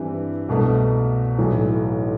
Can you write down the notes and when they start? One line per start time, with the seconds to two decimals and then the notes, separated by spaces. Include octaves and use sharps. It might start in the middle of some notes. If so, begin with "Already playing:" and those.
Already playing: G2 E3 G3 C4 E4
0.49 C2 B2 A3
1.38 B1 A2 E3